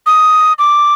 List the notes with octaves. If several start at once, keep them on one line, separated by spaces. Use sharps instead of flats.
D#6
D6